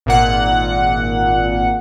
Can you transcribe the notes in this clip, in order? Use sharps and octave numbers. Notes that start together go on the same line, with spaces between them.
G#1 A#2 F#5